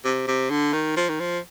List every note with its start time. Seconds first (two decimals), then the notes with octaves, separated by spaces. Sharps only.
0.05 C3
0.27 C3
0.50 D3
0.73 D#3
0.97 F3
1.09 D#3
1.20 F3